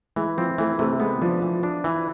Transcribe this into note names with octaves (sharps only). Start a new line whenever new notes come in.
E3 G#3
F3 C4
E3 A3
C3 A3
G#3 B3
F3 D4
E3
D4
E3